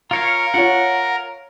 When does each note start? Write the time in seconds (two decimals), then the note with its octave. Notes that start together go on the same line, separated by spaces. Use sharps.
0.11 F4 A#4 C#5 F5
0.54 F4 C#5 F#5